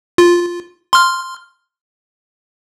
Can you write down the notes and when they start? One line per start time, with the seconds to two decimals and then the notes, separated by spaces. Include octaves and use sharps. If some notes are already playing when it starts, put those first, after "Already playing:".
0.18 F4
0.93 C6 F6